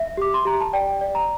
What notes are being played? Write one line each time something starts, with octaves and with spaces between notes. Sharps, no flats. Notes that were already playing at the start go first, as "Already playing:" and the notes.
Already playing: E5
G4 D6
C6
G4 A#5
A5
D5 G5
D5
A#5